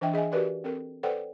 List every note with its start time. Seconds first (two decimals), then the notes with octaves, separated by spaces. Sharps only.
0.01 E3 D4 D#5 E5 G5
0.13 G#4 D#5 E5 G#5
0.32 F#4 G4 A#4 B4 D5
0.64 C4 A4 A#4
1.03 A4 B4 C5 D5 F#5 G5